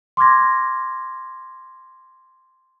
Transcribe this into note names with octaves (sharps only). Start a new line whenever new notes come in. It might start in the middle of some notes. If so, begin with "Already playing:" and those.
C6 D6 F6 G#6 A#6